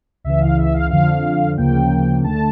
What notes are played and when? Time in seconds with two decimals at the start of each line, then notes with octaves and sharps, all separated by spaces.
0.24 C#2 C#3 E3 E5
0.41 F5
0.58 E5
0.74 F5
0.90 F2 D3 F3 F5
1.58 D2 C#3 F3 A#3 G5
2.24 D2 D3 A3 A5